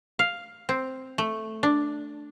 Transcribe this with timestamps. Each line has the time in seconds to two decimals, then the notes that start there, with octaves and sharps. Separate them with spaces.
0.19 F5
0.69 C4
1.18 A3
1.63 D4